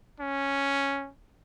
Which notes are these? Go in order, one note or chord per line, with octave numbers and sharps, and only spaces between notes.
C#4